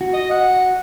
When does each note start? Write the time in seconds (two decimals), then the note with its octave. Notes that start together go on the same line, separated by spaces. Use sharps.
0.01 F#4
0.13 D#5
0.31 F#5